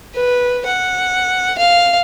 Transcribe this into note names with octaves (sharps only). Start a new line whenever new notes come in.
B4
F#5
F5